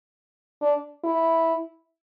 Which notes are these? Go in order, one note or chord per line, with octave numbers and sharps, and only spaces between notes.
D4
E4